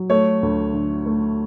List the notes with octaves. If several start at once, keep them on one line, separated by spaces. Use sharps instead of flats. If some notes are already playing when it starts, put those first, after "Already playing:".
Already playing: F#3
A3 C#5
D2
D3
A3